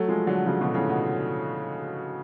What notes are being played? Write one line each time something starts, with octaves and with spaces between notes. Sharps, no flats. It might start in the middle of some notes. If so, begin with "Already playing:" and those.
Already playing: F#3 A3
F3 G#3
D3 F#3
C#3 F3
B2 D3
A2 C#3
B2